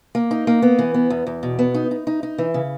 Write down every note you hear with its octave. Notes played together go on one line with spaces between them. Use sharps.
A#3
D#4
A#3
B3
E3
B3
E2
E2
B2
B3
D#4
D#4
D#4
D#4
E3
C#3